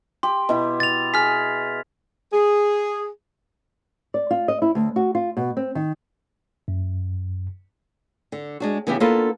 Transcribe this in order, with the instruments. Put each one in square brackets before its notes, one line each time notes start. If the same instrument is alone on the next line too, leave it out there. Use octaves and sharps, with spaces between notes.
[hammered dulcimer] G4 [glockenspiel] C6
[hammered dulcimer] B2 E4
[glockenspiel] A6 F7
[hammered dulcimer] G#4 [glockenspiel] F6 B6
[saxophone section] G#4
[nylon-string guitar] D5
F4
D#5
E4
D2
F#4
F4
B2
C4
D#3
[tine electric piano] F#2
[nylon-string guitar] D3
G#3 D4 F#4
C#3 E3 B3 E4 G4
A#3 B3 D4 F4 A4 B4